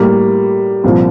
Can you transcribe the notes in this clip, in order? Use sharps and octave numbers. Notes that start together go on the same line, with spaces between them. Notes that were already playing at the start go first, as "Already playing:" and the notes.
Already playing: A2 G3 A#3
C2 A#2 F3